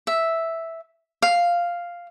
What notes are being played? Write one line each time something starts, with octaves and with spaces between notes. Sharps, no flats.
E5
F5